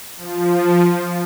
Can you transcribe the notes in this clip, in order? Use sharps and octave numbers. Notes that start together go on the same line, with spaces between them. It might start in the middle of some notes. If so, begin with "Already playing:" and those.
F3